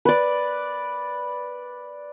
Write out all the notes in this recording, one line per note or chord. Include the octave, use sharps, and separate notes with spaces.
B4 D5